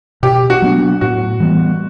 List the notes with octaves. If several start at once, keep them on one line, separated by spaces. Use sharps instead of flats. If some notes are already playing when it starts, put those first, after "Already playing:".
B2 G4
F#4
F#3 B3 D4
A2 F#4
E3 G3 B3